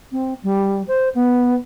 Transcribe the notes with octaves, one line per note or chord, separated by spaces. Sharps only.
C4
G3
C5
B3